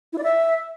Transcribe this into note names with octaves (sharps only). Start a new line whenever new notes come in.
E4
D5
E5